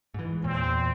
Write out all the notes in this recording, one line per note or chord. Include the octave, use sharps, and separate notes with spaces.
G#2 E3
E2 A#2 C4